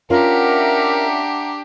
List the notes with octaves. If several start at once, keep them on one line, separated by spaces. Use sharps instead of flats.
C#4 D4 F4 G4 A#4 E5 F#5 A#5